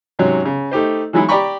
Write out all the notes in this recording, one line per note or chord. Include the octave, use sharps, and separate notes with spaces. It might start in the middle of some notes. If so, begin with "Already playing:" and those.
G#2 C3 F#3 C#4
C#3
A3 D#4 G4 C5
E3 F#3 G#3 D#4 E4
G4 D5 G5 A#5 B5 C#6